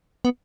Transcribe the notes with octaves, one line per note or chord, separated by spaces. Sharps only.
B3